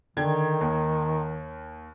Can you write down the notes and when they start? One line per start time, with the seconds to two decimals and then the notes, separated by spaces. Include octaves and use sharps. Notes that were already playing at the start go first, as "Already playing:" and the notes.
0.17 D3 D#3 G5 G#6
0.61 D#2